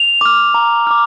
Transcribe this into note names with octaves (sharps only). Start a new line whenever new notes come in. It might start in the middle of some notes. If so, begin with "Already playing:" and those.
Already playing: F7
D6 F6
A#5
D6 F6